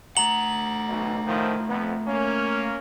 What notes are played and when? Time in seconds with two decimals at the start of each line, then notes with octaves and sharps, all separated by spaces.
0.17 A3 F#5 A#5 F#7
0.88 B1
1.26 A2 D#3 F3
1.68 F2 B3
2.07 A#3 C#4